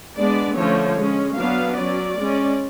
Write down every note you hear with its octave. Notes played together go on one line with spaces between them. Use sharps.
G#3 B3 D4 D5
D3 F3 A3 C#4 C#5
G#3 C#4
F#3 B3 D4 F5
F#3 C#4 D5
G#3 C#4